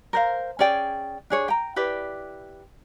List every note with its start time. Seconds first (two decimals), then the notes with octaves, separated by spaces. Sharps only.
0.13 A#4 C5 F5
0.59 C#4 G#4 D5 G5
1.30 D4 G#4 C#5
1.48 G5 A#5
1.76 E4 G4 B4 D5